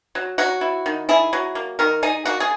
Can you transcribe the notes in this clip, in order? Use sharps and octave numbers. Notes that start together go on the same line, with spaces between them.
F#3
F#3 F#4
E4
D#3
E4 G#4
F#3
A#3
D#3 A#4
D#4 G#4
A#3 F#4
G#4